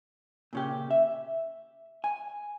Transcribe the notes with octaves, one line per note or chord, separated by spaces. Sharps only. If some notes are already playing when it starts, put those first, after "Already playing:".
A#2 C#3 G4
E5
G#5